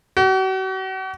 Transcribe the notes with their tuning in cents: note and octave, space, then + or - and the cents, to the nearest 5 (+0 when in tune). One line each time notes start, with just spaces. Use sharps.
F#4 +40